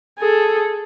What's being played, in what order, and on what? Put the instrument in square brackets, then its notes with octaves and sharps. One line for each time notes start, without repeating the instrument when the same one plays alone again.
[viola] G#4 A4